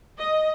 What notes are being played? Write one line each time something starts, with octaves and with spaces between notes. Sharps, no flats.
D#5